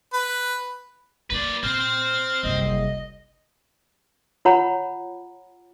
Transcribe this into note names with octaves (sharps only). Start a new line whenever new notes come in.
B4
A3 A#3 B4 D5
A#2 A3 C4 C5 F6
F#1 C2 D#5
F4 C#5 F#5 A#5 B5